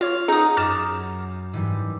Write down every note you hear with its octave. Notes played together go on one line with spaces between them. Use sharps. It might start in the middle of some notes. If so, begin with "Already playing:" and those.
F4 C#5 F5 C#6
D#4 G#4 F#5 D#6
F#2 D6 F6 A6 E7
G#2 E3 G3